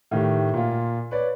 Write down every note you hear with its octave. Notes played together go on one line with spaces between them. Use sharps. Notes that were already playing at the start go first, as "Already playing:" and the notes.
A2 D#3 G4
A#2 F4
B4 C#5 D5